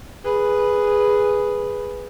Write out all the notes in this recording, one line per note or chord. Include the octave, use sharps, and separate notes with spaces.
G#4 B4